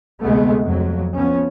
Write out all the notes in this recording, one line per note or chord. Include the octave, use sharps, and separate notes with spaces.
D2 C3 G#3 A3 B3
F2 F#3
F3 B3 C#4